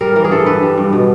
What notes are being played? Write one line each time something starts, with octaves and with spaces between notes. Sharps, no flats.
G3 A#4
E3 A#4
G#4
G2 A4
G2 B4
G3
G2
B2